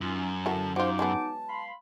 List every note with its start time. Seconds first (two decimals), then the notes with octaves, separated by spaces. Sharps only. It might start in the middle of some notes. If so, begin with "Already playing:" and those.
0.01 F#2 C#4 D#4 F4
0.46 D3 E4 F#4 A#4 A5
0.76 D#4 F4 F#4 C5 D6
0.99 F#3 G#3 B3 A5
1.49 F5 B5 C6